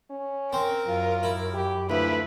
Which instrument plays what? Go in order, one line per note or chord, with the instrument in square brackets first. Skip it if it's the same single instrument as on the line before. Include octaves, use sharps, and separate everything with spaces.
[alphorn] C#4
[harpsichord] C4 [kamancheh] A#4
[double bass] F#2 [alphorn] F4
[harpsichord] E4
[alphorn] G4
[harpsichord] D2 [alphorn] F3 [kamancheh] E4 B4